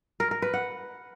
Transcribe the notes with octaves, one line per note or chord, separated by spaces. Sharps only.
A#4
A#4
B4
F#5